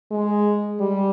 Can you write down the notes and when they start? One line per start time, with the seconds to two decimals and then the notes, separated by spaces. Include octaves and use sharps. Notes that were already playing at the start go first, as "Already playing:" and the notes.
0.11 G#3
0.81 G3